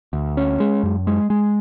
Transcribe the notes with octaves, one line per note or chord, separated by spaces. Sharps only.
D2
C#4
G#3
F#2
G#3
G#3